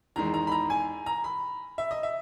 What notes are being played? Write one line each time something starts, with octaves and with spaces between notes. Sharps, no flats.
E2 D#3 G#3 A#5
A#5
B5
A#5
G#5
A#5
B5
E5
D#5
E5